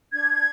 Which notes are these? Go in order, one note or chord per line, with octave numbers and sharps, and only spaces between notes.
D4 G#6